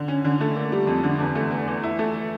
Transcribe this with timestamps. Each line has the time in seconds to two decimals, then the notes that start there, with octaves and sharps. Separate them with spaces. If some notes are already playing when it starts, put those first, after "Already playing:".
Already playing: D3
0.08 C#4
0.25 D3
0.40 A3
0.56 A#3
0.72 G3
0.87 F2
1.04 D3
1.20 E2
1.35 A3
1.51 E2
1.68 E3
1.83 E4
1.99 A3